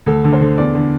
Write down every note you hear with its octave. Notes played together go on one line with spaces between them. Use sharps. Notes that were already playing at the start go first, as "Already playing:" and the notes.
D2 A4
D3
C5
D3
E2 D5
D3